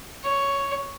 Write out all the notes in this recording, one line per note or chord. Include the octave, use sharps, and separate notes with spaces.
C#5